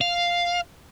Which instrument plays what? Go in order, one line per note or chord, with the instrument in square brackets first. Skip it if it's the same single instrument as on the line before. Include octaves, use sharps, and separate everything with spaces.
[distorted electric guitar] F5